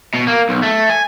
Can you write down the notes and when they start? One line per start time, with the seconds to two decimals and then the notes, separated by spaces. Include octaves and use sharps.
0.15 B2
0.28 A#3
0.49 B1
0.63 A3
0.90 G#5